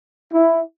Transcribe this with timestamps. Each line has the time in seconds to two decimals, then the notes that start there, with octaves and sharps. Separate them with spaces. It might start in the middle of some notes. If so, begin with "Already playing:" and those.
0.33 E4